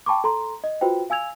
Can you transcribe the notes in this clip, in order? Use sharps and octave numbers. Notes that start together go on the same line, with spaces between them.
G5 A5 B5 C#6 D6
A4 A#5 C6
D#5
F4 F#4 B4 C5 G5
F5 G#5 E6 G#6 F7